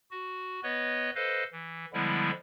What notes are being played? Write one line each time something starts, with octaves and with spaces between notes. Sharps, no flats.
F#4
B3 B4 C#5 D#5
A4 B4 C5 D#5 F5
E3
D3 F3 G3 G#3 B3 E4